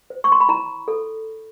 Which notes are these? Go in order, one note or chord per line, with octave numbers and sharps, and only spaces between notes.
C5
C#6
C6
B5
E4 A#5
A4